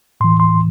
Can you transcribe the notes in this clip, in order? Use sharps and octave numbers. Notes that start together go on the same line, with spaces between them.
A2 E3 C6
C6